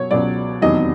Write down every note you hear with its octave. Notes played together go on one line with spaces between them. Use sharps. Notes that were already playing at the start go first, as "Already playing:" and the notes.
Already playing: B2 F#3 C#5
C#2 B2 F#3 D5
F1 E2 C3 D#3 F#3 D#5